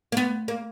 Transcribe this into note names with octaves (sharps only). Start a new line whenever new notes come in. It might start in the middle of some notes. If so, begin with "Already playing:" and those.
A#3
B3
A#3